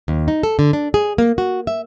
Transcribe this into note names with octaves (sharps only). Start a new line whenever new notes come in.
D#2
D#4
A4
D3
D4
G#4
A#3
F#4
E5